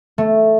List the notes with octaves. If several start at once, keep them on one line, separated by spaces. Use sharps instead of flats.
A3